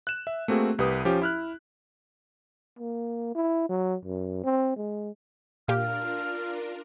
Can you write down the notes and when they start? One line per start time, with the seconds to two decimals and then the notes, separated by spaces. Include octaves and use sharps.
0.07 F#6 E7
0.27 E5
0.48 A3 A#3 C4 F#4 G#4
0.79 C2 G4 B4 D#6
1.05 F3 C#4 G4
1.22 E4 F6 F#6
2.79 A#3
3.35 E4
3.69 F#3
4.05 F#2
4.44 C4
4.77 G#3
5.68 A#2 D4 F4 G4 A#4 F5 F6